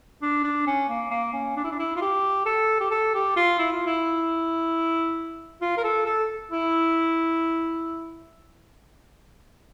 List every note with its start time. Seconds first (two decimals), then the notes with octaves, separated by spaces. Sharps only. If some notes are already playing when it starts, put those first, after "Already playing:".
0.22 D4
0.44 D4
0.67 C#4
0.89 A#3
1.11 A#3
1.33 C#4
1.57 D4
1.64 E4
1.71 D4
1.79 E4
1.96 F4
2.02 G4
2.46 A4
2.80 G4
2.91 A4
3.14 G4
3.36 F4
3.59 E4
3.72 F4
3.86 E4
5.62 F4
5.77 A#4
5.84 A4
6.06 A4
6.51 E4